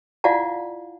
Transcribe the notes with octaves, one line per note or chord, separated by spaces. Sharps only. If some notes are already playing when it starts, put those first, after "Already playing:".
E4 F4 D5 F5 F#5 A5